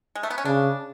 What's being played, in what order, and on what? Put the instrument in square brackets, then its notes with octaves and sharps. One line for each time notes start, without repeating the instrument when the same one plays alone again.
[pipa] G#3
A3
B3
C#4
[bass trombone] C#3 [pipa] D4